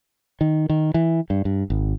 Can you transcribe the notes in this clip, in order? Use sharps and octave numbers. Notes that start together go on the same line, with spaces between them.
D#3
D#3
E3
G2
G2
G#1